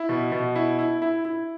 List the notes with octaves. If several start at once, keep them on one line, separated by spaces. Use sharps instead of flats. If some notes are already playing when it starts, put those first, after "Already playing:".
Already playing: E4
B2
B2
E4
E4
E4
E4